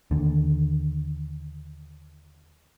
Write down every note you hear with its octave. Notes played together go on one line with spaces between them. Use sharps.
D#2 D3